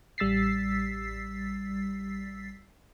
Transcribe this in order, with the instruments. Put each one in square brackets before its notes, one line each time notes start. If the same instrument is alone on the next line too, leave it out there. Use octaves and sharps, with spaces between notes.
[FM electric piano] A1 G3 E6 A6 B6 C7